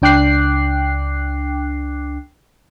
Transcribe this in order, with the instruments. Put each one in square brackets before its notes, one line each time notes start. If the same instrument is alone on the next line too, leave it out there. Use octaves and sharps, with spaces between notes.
[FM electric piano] C#2 D4 G5 D6 F#6 C7